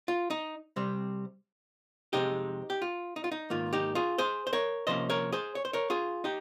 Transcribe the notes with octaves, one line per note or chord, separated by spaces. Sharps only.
F4
D#4
C3 G3 C4
F2 C3 D#3 G#3 C4 D#4 G4
G4
F4
D#4
F4
D#4
G#2 D#3 A#3 F4
D#4 G4
F4 G#4
G#4 C5
C5
A#4 C#5
C3 F3 A#3 C#4 C5 D#5
A#4 C#5
G#4 C5
C#5
C5
A#4 C#5
F4 G#4
D#4 G4